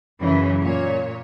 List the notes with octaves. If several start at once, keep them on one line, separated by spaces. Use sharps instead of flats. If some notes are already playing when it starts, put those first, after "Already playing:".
F#2 C#3 E3 F#3
A#2 C#5